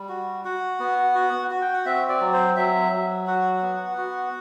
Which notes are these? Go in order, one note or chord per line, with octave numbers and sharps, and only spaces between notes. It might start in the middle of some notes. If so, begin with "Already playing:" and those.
Already playing: G3
F#4
F#4 F#5
B3
F#4
F#4
G5
F#5
C4 E5
D5
F#3
C5
F#3 E5
F#3
F#4 F#5
B3
F#4